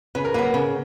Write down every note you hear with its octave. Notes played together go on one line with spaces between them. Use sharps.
C#3 B4
A#4
F#3 A#3 B4
A#4
C#3